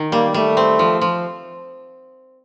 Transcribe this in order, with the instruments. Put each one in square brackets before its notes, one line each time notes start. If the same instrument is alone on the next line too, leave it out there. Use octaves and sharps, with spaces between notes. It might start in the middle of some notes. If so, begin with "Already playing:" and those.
Already playing: [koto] D#3
[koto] G3 [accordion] A#3
[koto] G3 [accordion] A3
[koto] C4
F3
F3